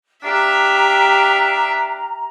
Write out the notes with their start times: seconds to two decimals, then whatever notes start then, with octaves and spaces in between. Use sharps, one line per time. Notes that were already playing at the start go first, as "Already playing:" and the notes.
0.23 D4 G4 E5 F5 A#5